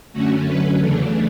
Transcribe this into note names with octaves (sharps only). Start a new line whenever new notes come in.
F#2 D3 A3 C#4 F#4
D3 F#3 C#4 B4
E2 C#3 E3 A3 D4